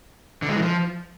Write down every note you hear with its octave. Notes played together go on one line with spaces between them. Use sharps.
D3
G#3
E3
F3